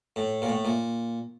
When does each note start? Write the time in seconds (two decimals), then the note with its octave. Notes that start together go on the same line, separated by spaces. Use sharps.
0.16 A2
0.42 A#2
0.49 A2
0.65 A#2